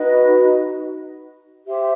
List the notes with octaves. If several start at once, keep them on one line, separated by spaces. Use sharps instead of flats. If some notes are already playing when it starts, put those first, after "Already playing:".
Already playing: D#4 F#4 B4 D#5
G4 C5 E5